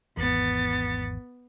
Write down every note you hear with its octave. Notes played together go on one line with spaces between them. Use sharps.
G#1 E2 B3 A6